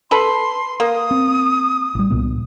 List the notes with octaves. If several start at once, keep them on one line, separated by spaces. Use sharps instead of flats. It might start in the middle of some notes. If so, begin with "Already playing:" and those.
A4 B4 B5 C6
A#3 D#6
C4
A1 G3
C2 A#2 B3